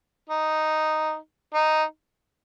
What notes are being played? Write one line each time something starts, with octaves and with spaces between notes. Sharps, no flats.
D#4
D#4